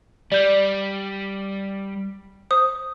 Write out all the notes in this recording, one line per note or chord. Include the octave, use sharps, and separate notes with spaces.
G3 D5 G6
C5 D#6